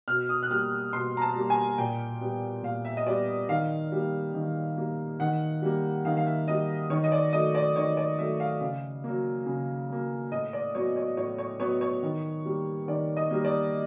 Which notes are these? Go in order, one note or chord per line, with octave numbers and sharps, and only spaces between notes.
B2 F6
D#6
F#6
G3 A#3 F6
B2 C6
A#5
A5
G3 A#3
G#5
A#2 G5
G3 B3
A#2 F5
E5
D#5
G3 B3 D5
D#3 F5
G3 A#3
D#3
G3 A#3
D#3 F#5
G3 A#3
D#3 F5
F5
E5
G3 A#3 D#5
D#3 C#5
D#5
D5
F#3 A3 D#5
D5
D#3 C#5
D5
F#3 A3 E5
F5
C#3 F5
F#3 A#3
C#3
F#3 A#3
A2 D#5
D5
F#3 B3 C#5
C#5
A2 C#5
C#5
F#3 B3 C#5
C#5
D#3
G3 A#3
D#3 D5
D#5
G3 A#3
D5